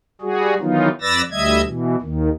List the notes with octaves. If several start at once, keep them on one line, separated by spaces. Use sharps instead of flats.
G3 F#4 G#4
D#3 E3 F#3 B3 D#4 F4
F2 B4 D5 E6 A6 A#6
D2 G3 D#5 E5 G#6
B2 E3
D#2 D#3